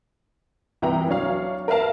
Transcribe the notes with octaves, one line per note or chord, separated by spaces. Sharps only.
C2 E3 E4 G5 A#5
F#3 D4 C#5 F5
A#4 B4 E5 F5 A5